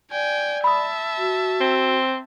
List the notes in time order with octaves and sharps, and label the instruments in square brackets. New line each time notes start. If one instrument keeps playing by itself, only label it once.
[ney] D5 [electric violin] G5 G#5
[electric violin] E5 A5 [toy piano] B5 D#6
[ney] F#4
[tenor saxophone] C4